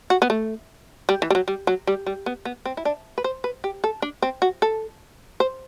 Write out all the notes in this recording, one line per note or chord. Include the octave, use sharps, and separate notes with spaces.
F#4
B3
A3
G3
E3
G3
F#3
G3
F#3
G3
G3
B3
B3
C4
E4
D4
B4
C5
B4
G4
A4
D4
C4
F#4
A4
C5